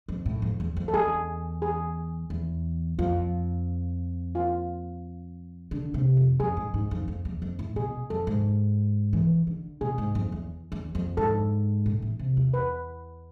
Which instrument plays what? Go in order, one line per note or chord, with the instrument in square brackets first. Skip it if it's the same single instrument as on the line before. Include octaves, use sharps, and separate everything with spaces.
[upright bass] F2
A2
F2
E2
F2
[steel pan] A4
[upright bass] E2 [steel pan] G#4
[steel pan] G#4
[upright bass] E2
[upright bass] F2 [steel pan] F4
[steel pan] F4
[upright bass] D3
C3
F2
[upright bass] F2 [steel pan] G#4
[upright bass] G#2
G#2
F2
F2
E2
F2
A2
[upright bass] B2 [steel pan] G#4
[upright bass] F2 [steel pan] A4
[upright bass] G#2
E3
D3
[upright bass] B2 [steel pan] G#4
[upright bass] G#2
F2
E2
E2
F2
[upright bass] G#2 [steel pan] A4
[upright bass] A2
E3
C3
E2
[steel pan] B4